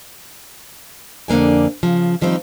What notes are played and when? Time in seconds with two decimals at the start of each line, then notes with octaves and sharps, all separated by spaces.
1.28 F2 D3 A#3 D4 G#5
1.83 C#3 F3
2.21 D#3 F3 G3 C4 D#4